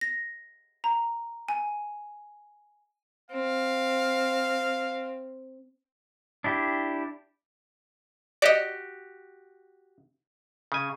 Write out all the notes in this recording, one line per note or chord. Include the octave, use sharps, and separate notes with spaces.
A#6
A#5
G#5
C4 F5
D4 E4 G4
F#4 G4 D5 D#5
C#3 G#5